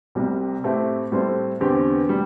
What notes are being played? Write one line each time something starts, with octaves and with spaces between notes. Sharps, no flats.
C2 C3 G3
A2 A3 C4 G4 E5
A2 G3 C4 A4 C5
E2 D3 C4 G4
G3